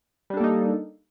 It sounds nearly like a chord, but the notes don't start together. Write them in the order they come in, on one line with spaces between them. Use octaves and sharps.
G3 D4 A4 A#3 D#4